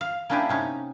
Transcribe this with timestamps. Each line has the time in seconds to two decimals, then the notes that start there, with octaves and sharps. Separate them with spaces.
0.01 F5
0.29 A#3 C#4 D4 E4 G4 G#4
0.49 C3 C#4 D#4